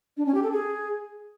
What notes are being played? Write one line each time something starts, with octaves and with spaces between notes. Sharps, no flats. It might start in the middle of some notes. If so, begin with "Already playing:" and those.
D4
C#4
G4
A4
G#4